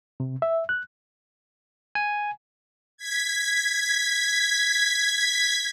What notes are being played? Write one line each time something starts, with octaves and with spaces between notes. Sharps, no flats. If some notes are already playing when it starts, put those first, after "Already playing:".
C3
E5
F#6
G#5
G#6 B6